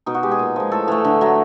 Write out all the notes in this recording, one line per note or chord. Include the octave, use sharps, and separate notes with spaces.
B2 D#4
F#4
G#3 G4
G#4
A#2
F3 G#3
A2 A4
E3 A3
D3
F#3 A3